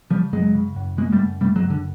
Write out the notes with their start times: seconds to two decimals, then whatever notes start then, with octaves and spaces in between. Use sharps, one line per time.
0.11 C#3 F3 G3
0.33 F#2 F#3 G#3
0.55 C#3
0.76 F#2
0.97 C#3 G#3 A#3
1.12 G3 A3
1.20 F#2
1.41 C#3 G3 A3
1.56 F#3 G#3
1.64 F#2
1.70 D3